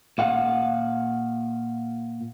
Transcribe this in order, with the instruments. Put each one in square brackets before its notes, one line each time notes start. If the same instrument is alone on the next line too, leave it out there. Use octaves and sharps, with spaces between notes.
[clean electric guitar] A#2 F5 F#5